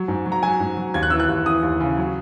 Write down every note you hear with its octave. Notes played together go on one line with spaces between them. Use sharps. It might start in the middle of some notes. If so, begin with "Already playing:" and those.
Already playing: F#3
G#2
F#3
A#5
F#3 G#5
G#2
F#3
D#2 G#6
F#6
E3 E6
F#6
D#2
E3 D#6
D#2
C#3
F#3